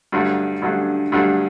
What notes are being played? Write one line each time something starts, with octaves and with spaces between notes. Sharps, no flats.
G2 D3 F#3 A3
G2 D3 F#3 A3
G2 D3 F#3 A3